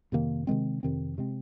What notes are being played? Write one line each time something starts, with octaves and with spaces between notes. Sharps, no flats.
F2 C3 D#3 A#3
C3 D#3 G#3 C4
F2 C3 D#3 C4
C3 G#3 C4